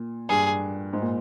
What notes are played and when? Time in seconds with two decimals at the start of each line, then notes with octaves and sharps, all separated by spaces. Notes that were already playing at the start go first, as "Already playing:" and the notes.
Already playing: A#2
0.29 G2 G#4
0.93 G#2
1.02 A#2